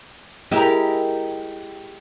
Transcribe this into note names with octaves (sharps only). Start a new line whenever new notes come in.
G#3 E4 G4 A#4